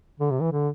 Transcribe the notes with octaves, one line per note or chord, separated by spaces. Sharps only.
D3
C3
E3
D3